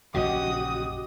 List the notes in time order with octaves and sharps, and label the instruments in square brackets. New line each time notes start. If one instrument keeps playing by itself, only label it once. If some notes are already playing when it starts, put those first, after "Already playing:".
[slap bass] A#1 F#2 C#3 [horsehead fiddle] F#4 [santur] G4 D#5 [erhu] D#6